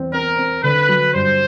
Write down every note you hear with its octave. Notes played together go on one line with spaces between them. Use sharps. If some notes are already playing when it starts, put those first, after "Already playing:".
Already playing: E2 C4
C4 A#4
C4
D3 B4
F#3
G2 C5